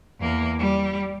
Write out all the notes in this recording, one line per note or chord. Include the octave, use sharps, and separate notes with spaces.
E2 A#3
G3